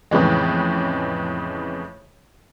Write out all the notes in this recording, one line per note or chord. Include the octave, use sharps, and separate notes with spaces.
F2 A2 C#3 E3 G#3